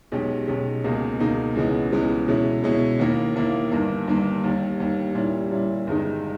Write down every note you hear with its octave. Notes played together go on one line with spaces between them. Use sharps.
B1 B2 G#3 C#4 G4
B1 B2 G#3 C#4 G4
C#2 B2 A#3 D#4 G#4
C#2 B2 A#3 D#4 G#4
C#2 C#3 E3 G#3 B3
C#2 C#3 E3 G#3 B3
B2 G#3 C#4 E4
B2 G#3 C#4 E4
D#2 D#3 A#3 E4
D#2 D#3 A#3 E4
G1 G2 D#3 A#3
G1 G2 D#3 A#3
D#2 D#3 G3
D#2 D#3 G3
A#2 G3 C#4 E4
A#2 G3 C#4 E4
G1 G2 D#3 G#3 D#4